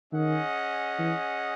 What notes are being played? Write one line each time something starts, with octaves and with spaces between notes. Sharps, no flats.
D#3 C#4 G#4 D#5 F#5
E3